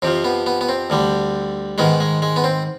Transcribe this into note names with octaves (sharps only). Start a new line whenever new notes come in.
F2 C3 F3 C4
B3
B3
B3
C4
D2 D3 G3
G#2 D#3 G#3 B3
G#3
G#3
B3
C4